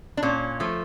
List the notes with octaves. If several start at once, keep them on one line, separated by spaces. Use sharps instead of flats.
D4
A#2 C#4
F3 A3